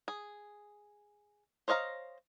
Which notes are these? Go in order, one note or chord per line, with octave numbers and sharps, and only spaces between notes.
G#4
C5 C#5 D#5 F5 A#5